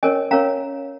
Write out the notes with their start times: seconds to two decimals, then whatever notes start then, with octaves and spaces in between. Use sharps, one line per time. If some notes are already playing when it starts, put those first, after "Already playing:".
0.03 C#4 A#4 C#5 D#5 G#5
0.31 C#4 A#4 C#5 F5 A#5